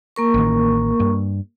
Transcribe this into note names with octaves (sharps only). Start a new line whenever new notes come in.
A#3 A#4 C#6
A1 D#3
G2